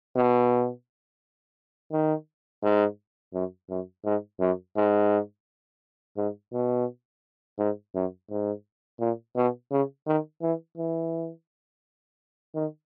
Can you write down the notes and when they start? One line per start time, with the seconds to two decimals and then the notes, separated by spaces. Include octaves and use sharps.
0.16 B2
1.92 D#3
2.63 G#2
3.33 F#2
3.70 F#2
4.04 G#2
4.40 F#2
4.76 G#2
6.17 G#2
6.53 B2
7.58 G#2
7.95 F#2
8.30 G#2
9.00 A#2
9.36 B2
9.71 C#3
10.07 D#3
10.42 E3
10.78 E3
12.55 D#3